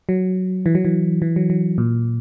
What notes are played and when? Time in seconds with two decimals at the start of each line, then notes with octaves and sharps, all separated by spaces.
0.09 F#3
0.66 E3
0.75 F#3
0.85 E3
1.22 E3
1.36 F#3
1.50 F#3
1.78 A#2